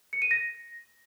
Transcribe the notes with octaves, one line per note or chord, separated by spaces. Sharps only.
C#7
D#7
A#6